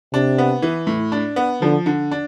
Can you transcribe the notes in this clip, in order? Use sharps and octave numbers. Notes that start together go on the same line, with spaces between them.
C3 D4
B3
E3
A2
D4
B3
D3 F3
D3
D4